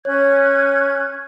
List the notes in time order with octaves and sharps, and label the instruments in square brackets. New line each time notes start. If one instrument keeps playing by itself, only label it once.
[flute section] C#4 F#6 G#6 [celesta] C#5